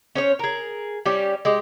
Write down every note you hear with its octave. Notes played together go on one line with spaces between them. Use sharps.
C#4 C5 C#5
G#4 A#4
G3 C#4 G4
G#3 G4